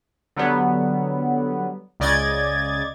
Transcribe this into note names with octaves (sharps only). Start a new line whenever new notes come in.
D3 F#3 G3 B3
C#2 C#3 D5 D#5 G#6 A6